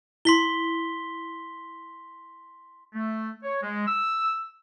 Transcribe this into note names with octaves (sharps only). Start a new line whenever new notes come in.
E4 C6 B6 G7
A3
C#5
G#3
E6